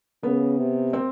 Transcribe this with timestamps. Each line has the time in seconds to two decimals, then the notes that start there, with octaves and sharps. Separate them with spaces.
0.23 C#3 B3
0.58 C3
0.93 C4